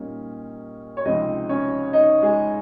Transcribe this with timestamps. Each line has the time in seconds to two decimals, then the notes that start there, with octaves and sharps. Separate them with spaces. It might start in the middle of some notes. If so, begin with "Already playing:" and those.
Already playing: A#2 G3 A#3 C#4 D#4
0.97 C#5
1.05 C#2 C3 F3 G#3 C4 D#4 D#5
1.49 C#4 C#5
1.93 D#4 D#5
2.22 G#3 G#4